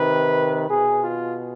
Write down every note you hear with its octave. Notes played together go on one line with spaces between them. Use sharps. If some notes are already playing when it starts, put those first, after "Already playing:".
Already playing: C3 D#3 B4
B2 G#4
F4